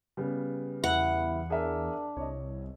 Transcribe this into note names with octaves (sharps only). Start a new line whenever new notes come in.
C#3 G3 B3
E2 E4 F#5
D4 G#4 A#4 E5
C2 C#5 D#5